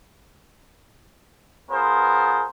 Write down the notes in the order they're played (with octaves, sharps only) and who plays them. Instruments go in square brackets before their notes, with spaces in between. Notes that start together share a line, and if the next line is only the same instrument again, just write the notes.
[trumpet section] B3 F4 G#4 A#4 C5